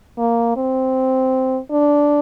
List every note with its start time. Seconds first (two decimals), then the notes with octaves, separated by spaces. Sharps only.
0.18 A#3
0.57 C4
1.71 D4